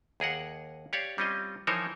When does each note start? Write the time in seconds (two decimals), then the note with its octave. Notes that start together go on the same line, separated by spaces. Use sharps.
0.20 D#2 G#4 A#4 F#5
0.93 G4 C#5 D5 F5
1.18 G3 C4 C#4 F4 D#5
1.67 E3 F3 D#4 A#4 C5 C#5